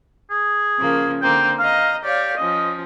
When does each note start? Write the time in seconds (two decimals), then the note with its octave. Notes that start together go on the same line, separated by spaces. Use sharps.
0.31 G#4
0.79 C#3 F3 A#3
1.22 D3 A#3 C4 G5
1.59 D#5 F5 A#5
2.04 G4 C#5 D5 F5
2.37 F3 C#4 D#5